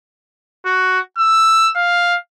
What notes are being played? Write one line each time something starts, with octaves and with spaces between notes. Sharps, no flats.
F#4
E6
F5